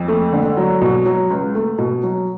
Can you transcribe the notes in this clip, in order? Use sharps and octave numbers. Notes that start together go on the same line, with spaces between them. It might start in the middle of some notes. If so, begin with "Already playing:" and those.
Already playing: F2
A3
D3
F#3
B2
F#3
C#2
A3
B2
F#3